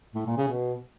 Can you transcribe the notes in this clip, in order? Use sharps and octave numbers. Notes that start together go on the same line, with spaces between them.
A2
A#2
C#3
B2